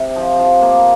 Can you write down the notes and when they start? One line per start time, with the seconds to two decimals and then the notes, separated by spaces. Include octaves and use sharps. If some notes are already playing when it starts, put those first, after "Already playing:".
Already playing: C3
0.16 F3
0.39 F3
0.62 A#3